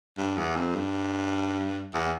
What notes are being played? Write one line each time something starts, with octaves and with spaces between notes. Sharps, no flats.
G2
E2
F2
G2
E2